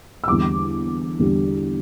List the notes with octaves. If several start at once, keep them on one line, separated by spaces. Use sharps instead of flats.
E6
E2 D3 G3 D6
E2 D3 G3